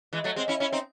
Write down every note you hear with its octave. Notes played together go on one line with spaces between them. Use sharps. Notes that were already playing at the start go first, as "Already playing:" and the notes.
E3 G#3
F#3 A3
G#3 C4
C#4 E4
C#4 E4
C4 D#4